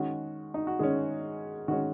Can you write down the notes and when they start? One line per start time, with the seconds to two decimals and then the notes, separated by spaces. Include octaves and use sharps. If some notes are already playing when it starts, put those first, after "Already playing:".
Already playing: D#3 G#3 C#4 F#4
0.54 D#4
0.67 F#4
0.79 D#3 G#3 C#4 G#4
1.68 D#3 G#3 C#4 F#4